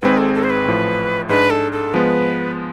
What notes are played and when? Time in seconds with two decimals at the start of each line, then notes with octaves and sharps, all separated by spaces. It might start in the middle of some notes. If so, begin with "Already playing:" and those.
0.02 G#1 G#2 G#3 C4 G#4 B4
0.18 A4
0.34 A4
0.44 C5
0.50 B4
0.65 A1 A2 F3
1.29 G#2 G#3 D4 B4
1.50 A4
1.72 A4
1.94 F3 G#3 B3 B4